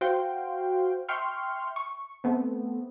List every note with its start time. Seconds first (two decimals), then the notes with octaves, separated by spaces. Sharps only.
0.01 F#4 C5 F5 G5
1.09 E5 G5 C6 C#6 F6
1.76 C#6
2.24 A3 B3 C4